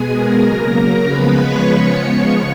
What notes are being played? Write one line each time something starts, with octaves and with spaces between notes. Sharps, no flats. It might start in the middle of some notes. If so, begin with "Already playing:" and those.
Already playing: B2 G#3 B3 G#4 G#5
A#4 A#5
C#3 F#3 A#3
C#3 F3 G#3 B3 B4 B5
C#5 C#6
C#3 F3 G#3 B3 C#5 C#6